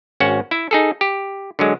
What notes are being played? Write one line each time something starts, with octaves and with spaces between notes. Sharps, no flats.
G#1 C#4 F#4 F#5
E4 E5
D#4 G#4 A4
G4
D3 F#3 G#3